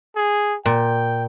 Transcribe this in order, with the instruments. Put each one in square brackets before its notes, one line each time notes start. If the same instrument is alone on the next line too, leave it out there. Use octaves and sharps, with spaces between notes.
[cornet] G#4
[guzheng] A#2 [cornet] G5